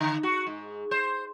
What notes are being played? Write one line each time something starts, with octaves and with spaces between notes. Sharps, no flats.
D3
F#4
G#2
C5